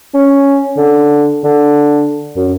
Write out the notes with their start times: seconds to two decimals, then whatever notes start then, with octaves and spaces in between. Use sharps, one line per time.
0.14 C#4
0.77 D3
1.44 D3
2.36 F#2